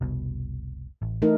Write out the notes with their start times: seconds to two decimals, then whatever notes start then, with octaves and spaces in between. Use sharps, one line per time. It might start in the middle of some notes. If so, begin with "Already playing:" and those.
0.01 F1 C2 B2
1.02 A1
1.22 E3 A3 D#4 A#4